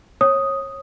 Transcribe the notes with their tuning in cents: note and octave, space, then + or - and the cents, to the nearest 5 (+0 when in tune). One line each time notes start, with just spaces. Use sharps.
C#5 -25 D#6 +0